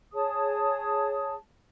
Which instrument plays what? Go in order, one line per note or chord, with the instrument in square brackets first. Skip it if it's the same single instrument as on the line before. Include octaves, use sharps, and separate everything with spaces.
[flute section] G#4 C#5 A5 D#6